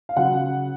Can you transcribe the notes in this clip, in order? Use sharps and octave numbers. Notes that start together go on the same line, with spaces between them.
F5
C#3 F#3 F#5